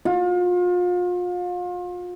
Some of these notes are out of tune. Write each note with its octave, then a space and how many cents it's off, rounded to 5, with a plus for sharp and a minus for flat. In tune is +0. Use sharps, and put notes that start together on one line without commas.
F4 +35